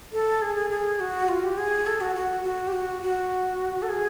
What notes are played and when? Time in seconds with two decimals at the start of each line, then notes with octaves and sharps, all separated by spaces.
0.13 A4
0.42 G#4
0.56 G#4
0.70 G#4
1.00 F#4
1.28 F4
1.43 G4
1.58 G#4
1.87 A4
2.01 F#4
2.16 F#4
2.44 F#4
2.68 G4
2.72 F#4
3.02 F#4
3.82 A4
3.89 G#4